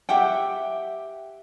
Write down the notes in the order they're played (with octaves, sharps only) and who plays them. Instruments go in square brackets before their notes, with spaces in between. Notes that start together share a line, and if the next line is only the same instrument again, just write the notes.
[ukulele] G4 E5 F#5 G5